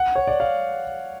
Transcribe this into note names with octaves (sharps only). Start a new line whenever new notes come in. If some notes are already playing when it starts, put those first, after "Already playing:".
Already playing: F#5
C#5
D5
F5